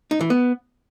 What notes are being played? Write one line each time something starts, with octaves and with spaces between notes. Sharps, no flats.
D#4
E3
B3